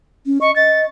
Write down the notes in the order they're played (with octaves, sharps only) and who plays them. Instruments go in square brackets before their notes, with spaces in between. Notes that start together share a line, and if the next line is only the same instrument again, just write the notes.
[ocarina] C#4
[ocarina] D#5 [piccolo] C#6
[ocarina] D#5 [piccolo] A6